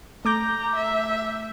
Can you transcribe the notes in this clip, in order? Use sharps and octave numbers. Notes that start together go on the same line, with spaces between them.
A3 A#5 D6 G6
E5